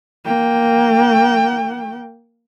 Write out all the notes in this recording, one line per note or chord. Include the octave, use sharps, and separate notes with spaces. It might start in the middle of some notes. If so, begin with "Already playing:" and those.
A#3 G5